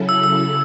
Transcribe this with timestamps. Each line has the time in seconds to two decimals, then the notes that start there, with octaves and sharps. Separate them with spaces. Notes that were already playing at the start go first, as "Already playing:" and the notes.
Already playing: C#3 F#3 C#4 E4 A4
0.09 E6
0.24 E6